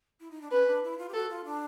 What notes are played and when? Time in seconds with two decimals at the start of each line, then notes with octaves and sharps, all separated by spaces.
0.20 E4
0.31 D#4
0.41 D4
0.51 C#4 B4
0.67 D4
0.83 E4
0.98 F4
1.09 G4
1.13 F#4 A4
1.29 F4
1.45 D4